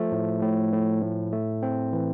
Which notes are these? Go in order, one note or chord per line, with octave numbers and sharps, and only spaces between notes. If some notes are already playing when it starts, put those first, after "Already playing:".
Already playing: F3 A3
A2
A2
A2
A2
A3
C4
E3